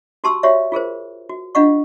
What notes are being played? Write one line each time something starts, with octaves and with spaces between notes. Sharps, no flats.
F#4 G4 A5 C6 C#6 E6
F#4 G4 C#5 D5 E5 F5
F4 G#4 A#4 C5
F#4
D4 F4 D#5 F5 F#5 C#6